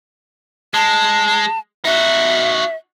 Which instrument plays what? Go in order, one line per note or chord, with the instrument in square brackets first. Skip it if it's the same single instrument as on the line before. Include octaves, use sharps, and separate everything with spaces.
[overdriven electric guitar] G#3 [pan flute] A5
[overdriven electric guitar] D#4 F#4 [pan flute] E5